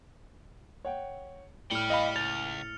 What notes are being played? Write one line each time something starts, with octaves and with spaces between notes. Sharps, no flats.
C#5 F#5 G5
A2 D5 G5 F6 C#7
D#5 F5 B5
C#2 A6 F7